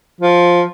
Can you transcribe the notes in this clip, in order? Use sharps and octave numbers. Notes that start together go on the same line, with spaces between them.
F3